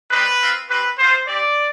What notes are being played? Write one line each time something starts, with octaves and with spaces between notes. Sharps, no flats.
G3 C4 D#4 B4
C4 F4
C4 G4 B4
B3 F4 C5
C4 G4 D5